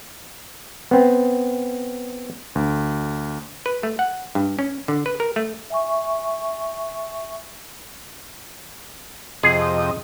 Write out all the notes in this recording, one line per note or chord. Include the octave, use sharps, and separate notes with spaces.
B3 C4
D2
B4
A3
F#5
G2
C#4
D3
B4
A#4
A3
E5 G#5 C#6
F2 C3 G#4 D#5